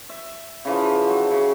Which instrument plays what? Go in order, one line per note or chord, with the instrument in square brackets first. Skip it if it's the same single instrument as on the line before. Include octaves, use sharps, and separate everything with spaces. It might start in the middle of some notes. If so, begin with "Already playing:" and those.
[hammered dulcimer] E5
C#3 E3 F3
F#3
C#3